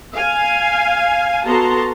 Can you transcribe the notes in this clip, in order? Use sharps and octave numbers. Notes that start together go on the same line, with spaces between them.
F5 G#5
B3 F#4 A4 A5 A#5 C6